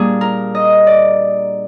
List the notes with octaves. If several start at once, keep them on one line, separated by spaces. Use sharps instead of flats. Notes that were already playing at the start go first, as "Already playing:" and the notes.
Already playing: A#2 G3 A#3 D4 G#4
A#4
D#5
D5